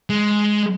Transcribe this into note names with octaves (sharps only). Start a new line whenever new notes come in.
G#3